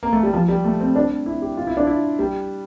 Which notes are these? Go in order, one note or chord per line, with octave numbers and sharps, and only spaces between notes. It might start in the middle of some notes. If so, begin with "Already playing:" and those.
A#3
A3
G3
F3
G3
A3
C4
D4
E4
G4
F4
E4
D4
E4
G3